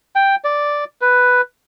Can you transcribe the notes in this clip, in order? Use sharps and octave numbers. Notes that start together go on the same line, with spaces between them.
G5
D5
B4